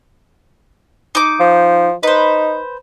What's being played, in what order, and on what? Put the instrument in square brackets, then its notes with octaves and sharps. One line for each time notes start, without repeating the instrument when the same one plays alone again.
[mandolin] D#4 D6
[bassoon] F3
[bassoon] D#4 [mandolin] B4 C5